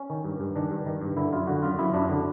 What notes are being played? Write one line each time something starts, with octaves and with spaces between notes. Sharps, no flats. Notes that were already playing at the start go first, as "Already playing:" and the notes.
Already playing: C#4
D#3
G2
G2
D#3 D4
G2
D#3
G2
D3 E4
F#2 F4
D3 F#4
F#2 F4
F#2 E4
F#2 D4
D3 D4